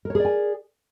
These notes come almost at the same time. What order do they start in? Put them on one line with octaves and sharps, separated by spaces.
A#4 C#5 G#4 D5 G#5